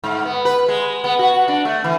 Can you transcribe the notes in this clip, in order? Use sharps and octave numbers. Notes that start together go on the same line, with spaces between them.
G#2
B3
B4
G#3
B3
F#4
D4
A3
E3